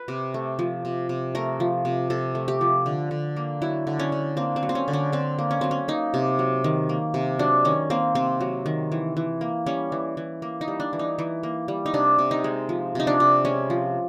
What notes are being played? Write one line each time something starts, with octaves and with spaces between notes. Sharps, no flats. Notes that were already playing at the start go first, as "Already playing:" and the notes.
Already playing: B4
C3
A3
F3
C3
C3
A3 A#4
F3
C3
C3 A4
A3
G4
F3
D3
D3
A#3
F#3 E4
D3
C#4
D3
A#3 C4
C4
F#3
C4
C#4
D3
C#4
D3 C4
A#3
C#4
F#3 C4
C#4
A#3 D#4
C3
F#3
D#3
A#3
C3
F#3 D4
D#3 C#4
A#3 C4
C3 C4
F#3
D#3
E3
E3
A#3
G3 C#4
E3
E3
A#3
D#4
G3
D4
E3
D#4
E3
A#3
G3
D#4
C3 D4
C3
D#4
G#3
F3
C3 D#4
D4
C3
G#3 C#4
F3